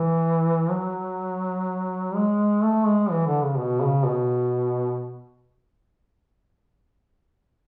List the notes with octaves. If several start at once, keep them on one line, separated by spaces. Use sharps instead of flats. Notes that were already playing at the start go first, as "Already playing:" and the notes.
Already playing: E3
F#3
G#3
A3
G#3
E3
D3
C#3
B2
C#3
B2